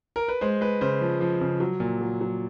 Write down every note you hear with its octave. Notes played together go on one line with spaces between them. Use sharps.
A#4
B4
G#3 C5
G#3 B4
C#3 C5
F3
F3
C#3
F#3
A#2
F#3
F#3